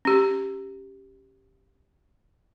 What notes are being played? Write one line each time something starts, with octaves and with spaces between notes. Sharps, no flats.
C#4 G4